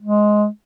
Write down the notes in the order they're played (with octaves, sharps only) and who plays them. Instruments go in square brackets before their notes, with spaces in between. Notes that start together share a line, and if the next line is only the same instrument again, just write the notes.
[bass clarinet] G#3